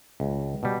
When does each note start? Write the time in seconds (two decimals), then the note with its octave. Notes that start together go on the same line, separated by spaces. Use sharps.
0.20 C#2
0.63 B2 G3